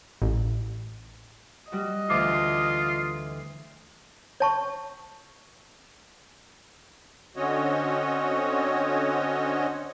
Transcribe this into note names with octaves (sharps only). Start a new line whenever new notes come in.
A1
G3 F#4 D#5
D2 E3 F4 D6
C#5 A5 C#6
D3 C4 C#4 F#4 C#5 D#5